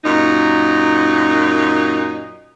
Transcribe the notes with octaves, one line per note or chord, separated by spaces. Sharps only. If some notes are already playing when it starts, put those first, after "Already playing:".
F#2 A#2 D#4